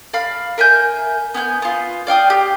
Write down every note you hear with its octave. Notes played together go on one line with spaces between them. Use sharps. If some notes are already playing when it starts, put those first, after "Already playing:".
D5 F5 B5 F6
A#4 E5 G#5 G6
B3 G#5 F#6 G6
B3 F4
D5 F5 G5 D#6
G4